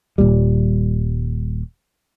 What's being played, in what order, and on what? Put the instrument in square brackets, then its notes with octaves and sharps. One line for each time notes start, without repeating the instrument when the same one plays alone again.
[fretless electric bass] D#1 C#2 A#2 G3